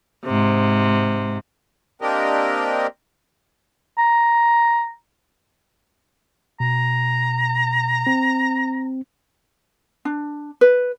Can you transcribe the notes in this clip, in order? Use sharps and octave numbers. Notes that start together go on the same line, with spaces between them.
G#2 C3
A#3 C4 D4 G4 A#4 D#5
A#5
B2 A#5
C4
D4
B4